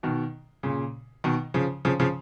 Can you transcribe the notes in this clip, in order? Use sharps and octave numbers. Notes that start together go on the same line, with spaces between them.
B2 D#3
A#2 C#3
B2 D#3
C#3 F3
C#3 F3
C#3 F3